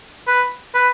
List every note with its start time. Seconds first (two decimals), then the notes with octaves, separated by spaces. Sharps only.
0.28 B4
0.75 B4